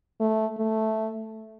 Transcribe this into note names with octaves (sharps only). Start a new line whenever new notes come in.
A3
A3